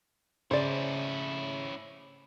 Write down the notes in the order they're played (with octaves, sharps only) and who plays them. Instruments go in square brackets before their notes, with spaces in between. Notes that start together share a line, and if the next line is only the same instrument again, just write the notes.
[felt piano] C#3 [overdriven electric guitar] C#4 E4 [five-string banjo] C5 D5